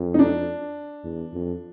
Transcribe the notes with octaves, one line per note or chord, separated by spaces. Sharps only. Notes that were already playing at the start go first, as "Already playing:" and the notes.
Already playing: F2
D#4
D4
E2
F2